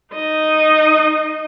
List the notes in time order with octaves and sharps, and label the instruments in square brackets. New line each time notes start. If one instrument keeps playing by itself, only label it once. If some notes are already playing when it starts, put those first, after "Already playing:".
[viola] D#4 D#5